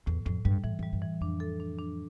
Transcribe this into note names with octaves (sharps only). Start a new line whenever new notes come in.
E2 A2
F2 A2
G2 G3
A2 E3
F2 G3
G2
E3
F2 D4
A4
D4
D4